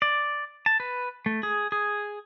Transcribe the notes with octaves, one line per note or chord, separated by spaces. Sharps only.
D5
A5
B4
A3
G#4
G#4